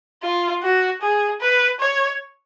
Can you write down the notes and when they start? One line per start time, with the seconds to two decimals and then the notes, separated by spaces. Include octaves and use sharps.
0.23 F4
0.62 F#4
1.02 G#4
1.41 B4
1.80 C#5